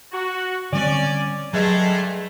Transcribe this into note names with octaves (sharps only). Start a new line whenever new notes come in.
F#4
D3 G3 C4 C#4 D5
G2 F#3 G#3 A3